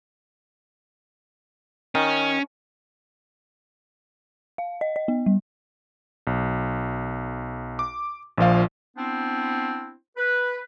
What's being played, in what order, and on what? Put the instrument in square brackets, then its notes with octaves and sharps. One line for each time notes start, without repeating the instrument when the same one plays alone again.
[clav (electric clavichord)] D#3 [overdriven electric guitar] C#4
[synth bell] F5
D#5
D#5
B3
G3
[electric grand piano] B1
D6
A#1 A#2 F3 F5
[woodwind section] B3 C4 D4 E4 C5
B4